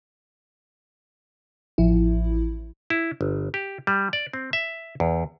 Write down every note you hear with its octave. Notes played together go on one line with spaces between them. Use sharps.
A1 F3 E4
E4
G1
G4
G3
D5
C4
E5
E2